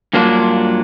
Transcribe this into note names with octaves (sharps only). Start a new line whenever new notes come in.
G2 F#3 A#3 D4 F4